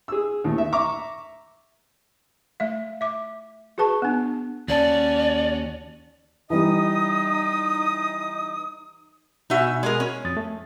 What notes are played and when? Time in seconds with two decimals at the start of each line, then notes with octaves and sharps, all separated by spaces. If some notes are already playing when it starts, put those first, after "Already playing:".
0.08 G#4 E6
0.44 D#2 A2
0.58 E5
0.72 E5 A#5 C#6 D6
2.60 A3 E5 F5
3.01 E5 D6
3.78 F#4 G#4 B4 A5 C#6
4.02 B3 D4
4.68 D#2 C#4 F#4 C#5 D5 A5
6.50 E3 G3 D#4 D#5 D#6
9.50 B2 D#4 F#4 E5 G#5
9.83 G#3 G#4 A#4
10.00 C#4
10.25 F2 D#6 A6
10.37 A3